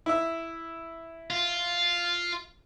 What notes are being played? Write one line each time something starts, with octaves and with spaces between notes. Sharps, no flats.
E4 E5
F4